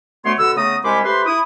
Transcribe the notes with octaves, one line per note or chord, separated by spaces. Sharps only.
D2 A3 B3 C#5 C6
B2 D3 F#5 E6
C#3 A3 B3 A#5 D#6
C2 G#3 C#4 C5 B5 D6
A3 G4 B4 C5 B5 C6
E4 D#6